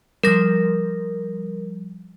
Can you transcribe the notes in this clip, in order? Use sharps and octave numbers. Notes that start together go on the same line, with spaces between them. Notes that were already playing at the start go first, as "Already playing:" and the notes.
F3 G3 A#4 A#6